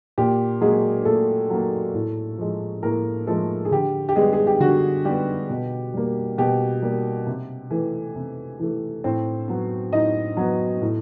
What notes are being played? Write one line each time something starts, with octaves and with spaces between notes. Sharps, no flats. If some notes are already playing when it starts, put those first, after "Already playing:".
A#2 G4
F#3 G#3 A#3 G#4
A#2 A3 A4
F#3 A#3
A2
F3 G#3
A2 A#3 A#4
F3 G#3 A3 A4
G#4
D3 G4
G4
G3 G#3 B3 G#4
G#4
G4
D3 F#4
G3 B3 G4
B2
G3 A#3
B2 G4
G3 A#3
C3
E3 A3
C3
E3 A3
A2 C4 C5
F#3 B3
A2 D#4 D#5
F#3 B3
A2